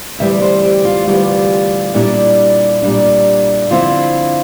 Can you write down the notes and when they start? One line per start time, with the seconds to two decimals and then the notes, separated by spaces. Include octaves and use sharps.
0.19 D2 C3 E3 G3 E5
0.41 C5
0.63 G4
0.85 F4
1.07 D2 C3 E3 G3 F4
1.95 A#2 G3 D4 E4
2.82 A#2 G3 D4
3.70 D3 F3 C4 E4 F4